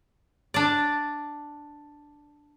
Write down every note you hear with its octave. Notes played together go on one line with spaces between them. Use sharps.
D4 D5